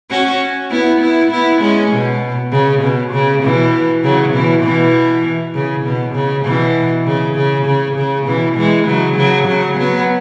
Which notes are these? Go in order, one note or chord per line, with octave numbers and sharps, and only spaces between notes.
C#4 F#4
B3 E4
B3 E4
B3 E4
G#3 C#4
B2
C#3
B2
C#3
B2 E3
C#3 F#3
B2 E3
B2 E3
C#3
B2
C#3
B2 E3
C#3
C#3
C#3
C#3
B2 E3
E3 G#3
C#3 F#3
C#3 F#3
C#3 F#3
F#3 B3